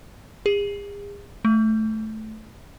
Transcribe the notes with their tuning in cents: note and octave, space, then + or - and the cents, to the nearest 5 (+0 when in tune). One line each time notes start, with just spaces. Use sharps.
G#4 -40
A3 -10